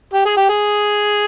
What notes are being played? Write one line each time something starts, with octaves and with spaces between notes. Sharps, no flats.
G4
G#4
G4
G#4